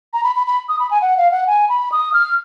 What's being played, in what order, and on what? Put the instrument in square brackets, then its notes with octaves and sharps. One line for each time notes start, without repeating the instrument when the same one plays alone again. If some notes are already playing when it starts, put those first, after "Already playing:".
[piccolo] A#5
B5
B5
B5
D#6
B5
G#5
F#5
F5
F#5
G#5
B5
D#6
F6